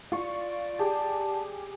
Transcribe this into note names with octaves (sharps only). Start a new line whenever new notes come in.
F4 D5 C#6
G4 G#4 A5